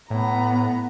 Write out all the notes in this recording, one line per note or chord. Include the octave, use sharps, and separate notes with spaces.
A2 B3 A#5